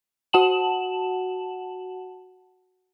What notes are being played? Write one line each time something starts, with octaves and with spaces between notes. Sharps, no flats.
F#4 F#5 A5 E7 F#7